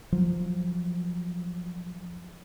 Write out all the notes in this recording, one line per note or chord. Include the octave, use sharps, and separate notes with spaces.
F3 F#3